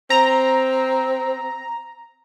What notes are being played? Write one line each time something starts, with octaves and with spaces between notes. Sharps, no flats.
C4 A#5